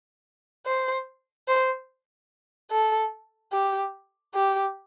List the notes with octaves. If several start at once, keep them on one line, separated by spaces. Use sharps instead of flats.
C5
C5
A4
G4
G4